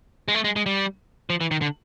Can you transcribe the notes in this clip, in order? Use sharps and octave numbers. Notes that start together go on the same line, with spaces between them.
G#3
A3
G#3
G#3
G3
F3
E3
D#3
D3